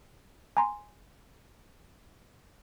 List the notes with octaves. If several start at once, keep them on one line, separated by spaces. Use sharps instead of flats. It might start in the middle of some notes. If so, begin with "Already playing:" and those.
G#5 A#5 C6